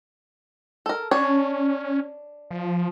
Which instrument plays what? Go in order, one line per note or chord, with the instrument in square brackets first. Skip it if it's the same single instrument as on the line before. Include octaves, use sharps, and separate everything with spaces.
[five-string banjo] A4 A#4
[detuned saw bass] C#4 [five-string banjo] D4 C#5
[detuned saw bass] F3